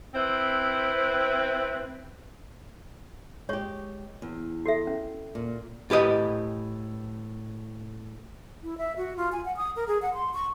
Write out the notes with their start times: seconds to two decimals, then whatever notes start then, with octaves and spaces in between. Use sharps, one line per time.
0.15 C4 E4 B4 C5
3.49 G#3 G4 C#5 C#6
4.22 E2
4.66 F#4 A4 E5
4.87 C#4
5.35 A#2
5.90 A2 G4 B4 D#5
8.63 E4
8.78 E5
8.97 F#4
9.17 F4
9.32 G#5
9.45 F#5
9.57 D#6
9.76 A#4
9.87 G#4
10.02 F#5
10.14 C6
10.34 C#6